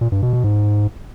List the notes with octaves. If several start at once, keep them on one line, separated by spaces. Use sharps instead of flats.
A#2
G2
B2
B2
G#2